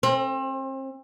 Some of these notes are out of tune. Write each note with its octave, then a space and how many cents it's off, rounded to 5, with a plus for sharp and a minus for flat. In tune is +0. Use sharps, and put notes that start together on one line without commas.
C4 +35